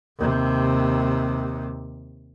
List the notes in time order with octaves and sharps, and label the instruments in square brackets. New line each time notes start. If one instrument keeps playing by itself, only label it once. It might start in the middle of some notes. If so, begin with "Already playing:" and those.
[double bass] D#2 C3